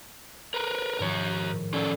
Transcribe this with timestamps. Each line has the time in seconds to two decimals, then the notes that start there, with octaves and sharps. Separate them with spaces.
0.54 A#4 B4
0.99 G#2 D#3 F3 A#4 C#5
1.52 A2
1.74 C#4 A4 D5